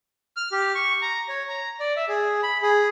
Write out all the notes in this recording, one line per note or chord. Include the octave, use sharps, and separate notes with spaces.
F6
G4
C#6
A#5
C#5
A#5
D5
E5
G#4
B5
G#4